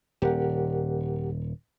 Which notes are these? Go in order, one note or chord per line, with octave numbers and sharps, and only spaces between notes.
D#1 G4 A#4 F#5